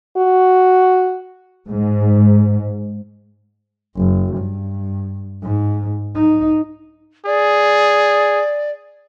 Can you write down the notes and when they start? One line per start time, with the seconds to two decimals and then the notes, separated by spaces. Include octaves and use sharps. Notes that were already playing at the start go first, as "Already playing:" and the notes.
0.17 F#4
1.67 G#2
3.96 F#1
4.37 G2
5.42 G#2
6.15 D#4
7.26 G#4 D5